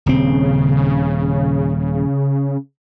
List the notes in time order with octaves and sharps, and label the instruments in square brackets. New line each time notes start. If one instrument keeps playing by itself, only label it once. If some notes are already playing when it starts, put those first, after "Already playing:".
[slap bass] D#1 C4 [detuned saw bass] C#3